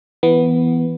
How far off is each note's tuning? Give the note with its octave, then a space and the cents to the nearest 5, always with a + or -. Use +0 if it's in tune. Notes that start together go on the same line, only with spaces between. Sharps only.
E3 +0 B3 +0